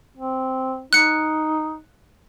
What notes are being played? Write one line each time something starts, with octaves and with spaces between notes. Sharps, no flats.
C4
D#4 F#6 C#7